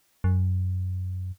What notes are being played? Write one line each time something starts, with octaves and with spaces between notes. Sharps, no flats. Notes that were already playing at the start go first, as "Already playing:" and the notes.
F#2